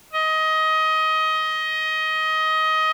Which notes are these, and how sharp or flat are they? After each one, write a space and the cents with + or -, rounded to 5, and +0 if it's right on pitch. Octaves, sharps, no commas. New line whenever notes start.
D#5 +20